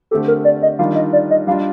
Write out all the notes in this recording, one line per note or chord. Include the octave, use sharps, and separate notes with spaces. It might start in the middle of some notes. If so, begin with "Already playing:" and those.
D3 A3 C4 G4 A4
A#4
D5
D#5
D#3 G3 D4 F4 F5
D#5
D5
D#5
G3 D4 F4 F5